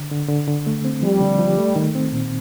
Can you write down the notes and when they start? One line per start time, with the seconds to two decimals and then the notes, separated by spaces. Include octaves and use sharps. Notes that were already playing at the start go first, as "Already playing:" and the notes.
Already playing: D3
0.11 D3
0.29 D3
0.48 D3
0.67 A3
0.85 C4
1.02 F3 G3
1.21 D3
1.39 F3
1.58 A3
1.76 D#3
1.95 C4
2.13 A#2